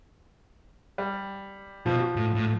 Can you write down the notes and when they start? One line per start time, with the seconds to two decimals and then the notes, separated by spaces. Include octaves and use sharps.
0.98 G3
1.86 B2 F3
2.16 A2
2.35 A2